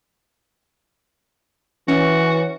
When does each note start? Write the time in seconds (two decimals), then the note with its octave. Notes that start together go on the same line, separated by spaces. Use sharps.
1.88 E3 C#4 F#4